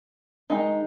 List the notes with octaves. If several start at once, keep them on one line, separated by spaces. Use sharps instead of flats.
D#3 G#3 D#4